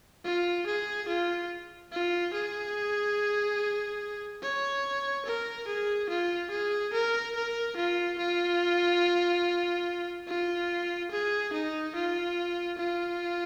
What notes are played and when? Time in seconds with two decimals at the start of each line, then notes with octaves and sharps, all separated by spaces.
0.25 F4
0.67 G#4
1.08 F4
1.92 F4
2.33 G#4
4.42 C#5
5.25 A#4
5.68 G#4
6.09 F4
6.51 G#4
6.93 A#4
7.35 A#4
7.77 F4
8.18 F4
10.27 F4
11.11 G#4
11.53 D#4
11.95 F4
12.78 F4